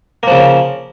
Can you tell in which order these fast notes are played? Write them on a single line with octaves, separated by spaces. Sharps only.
A#3 F3 C#3